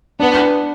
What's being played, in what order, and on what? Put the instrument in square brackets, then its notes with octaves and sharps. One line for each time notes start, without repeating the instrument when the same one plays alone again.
[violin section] B3 [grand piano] D4